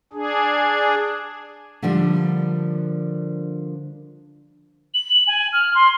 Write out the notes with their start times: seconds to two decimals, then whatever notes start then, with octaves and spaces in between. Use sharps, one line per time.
0.13 D4 G#4
1.82 D3 F3 G3 A#3 D4
4.94 F#7
5.27 G#5
5.53 F6
5.75 C6